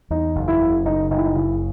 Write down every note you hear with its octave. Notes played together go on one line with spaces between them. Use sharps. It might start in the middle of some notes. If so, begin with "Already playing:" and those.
E2 D#4
F#1
E4
C#3
F#1 D#4
F#1 D#4
E4
D#4
C#3 E4